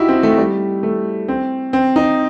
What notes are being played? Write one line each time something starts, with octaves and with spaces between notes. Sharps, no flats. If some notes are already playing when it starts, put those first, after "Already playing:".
Already playing: D#4 E4 F#4 G4
C4
A3
G3
A3
C4
C4
D#4